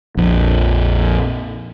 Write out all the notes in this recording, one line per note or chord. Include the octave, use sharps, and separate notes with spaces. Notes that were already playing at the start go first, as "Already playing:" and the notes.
A#1 F2